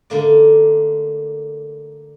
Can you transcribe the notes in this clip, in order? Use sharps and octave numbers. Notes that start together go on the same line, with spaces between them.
D3 A3 A#3 D5